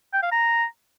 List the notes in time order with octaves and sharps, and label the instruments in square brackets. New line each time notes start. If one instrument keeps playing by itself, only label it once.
[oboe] G5
F5
A#5